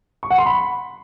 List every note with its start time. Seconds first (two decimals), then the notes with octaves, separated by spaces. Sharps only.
0.23 C#6
0.30 F#5
0.38 C6
0.46 B5